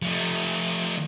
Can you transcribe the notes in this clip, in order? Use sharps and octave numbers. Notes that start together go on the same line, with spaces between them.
F3 A3